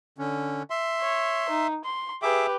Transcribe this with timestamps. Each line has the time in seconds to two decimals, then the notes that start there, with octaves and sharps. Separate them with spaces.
0.18 D3 C#4
0.70 E5 C6
1.01 C#5
1.49 D#4
1.84 C6
2.23 G4 G#4 B4 E5 D6